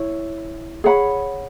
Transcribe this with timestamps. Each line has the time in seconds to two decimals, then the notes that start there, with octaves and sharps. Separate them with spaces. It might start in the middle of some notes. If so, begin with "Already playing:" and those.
Already playing: E4 C#5
0.84 G#4 C#5 F#5 B5